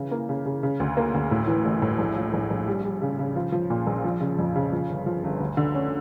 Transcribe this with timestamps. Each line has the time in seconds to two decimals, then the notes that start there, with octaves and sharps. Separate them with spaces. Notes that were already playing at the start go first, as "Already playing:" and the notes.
Already playing: C#3 E3
0.11 A#3
0.29 C#3
0.45 C#3
0.63 C#3
0.80 D2
0.97 A#3
1.14 D2
1.31 A2
1.47 E3
1.65 A1
1.82 A2
1.99 A#1
2.16 F3
2.34 A#1
2.51 A#1
2.67 G3
2.84 G3
3.02 C#3
3.19 C#3
3.36 F3
3.52 F3
3.70 A#2
3.87 A#1
4.04 F3
4.21 C#3
4.38 F2
4.56 C#3
4.73 F3
4.90 G1
5.06 F3
5.24 G1
5.40 D2
5.57 D3
5.74 C#4